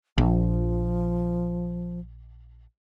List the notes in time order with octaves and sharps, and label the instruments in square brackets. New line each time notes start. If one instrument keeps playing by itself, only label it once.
[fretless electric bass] A#1 [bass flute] F3